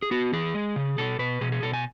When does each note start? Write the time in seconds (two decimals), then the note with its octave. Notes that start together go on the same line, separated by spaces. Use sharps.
0.02 G#4
0.11 B3 F#4
0.33 E3 G#4
0.54 G#3
0.76 C#3
0.98 B2 A4
1.19 B2 B4
1.41 B2 G#4
1.52 G#4
1.62 B2 A4
1.73 G#5